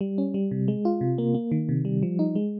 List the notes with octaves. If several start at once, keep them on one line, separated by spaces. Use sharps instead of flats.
G3
C#4
G3
C3
G#3
F4
C3
A#3
A#3
D#3
C3
G3
F3
D#4
G#3